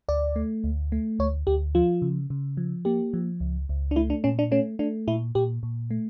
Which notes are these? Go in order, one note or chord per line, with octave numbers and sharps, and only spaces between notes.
D2 D5
A3
D2
A3
D2 C#5
D2 G4
F3 F4
C#3
C#3
F3
A#3 G4
F3
C#2
C#2
D4
A3 E4
D4
A#2 C#4
D4
A3 C#4
A3 D4
A#2 E4
A#2 G4
A#2
A3